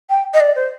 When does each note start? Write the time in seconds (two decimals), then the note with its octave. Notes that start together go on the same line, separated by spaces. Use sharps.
0.10 G5
0.34 D#5
0.40 D5
0.55 C5